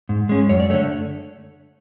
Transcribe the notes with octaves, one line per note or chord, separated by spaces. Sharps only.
G#2
G#3 C#4
F#2 C#5
D5
D3 A3 C#5